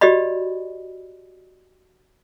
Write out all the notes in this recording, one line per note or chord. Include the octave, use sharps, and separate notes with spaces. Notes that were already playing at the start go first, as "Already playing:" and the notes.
F#4 G4 D5 D#5 B5